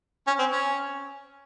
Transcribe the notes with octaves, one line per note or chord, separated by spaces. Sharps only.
C#4
C4
C#4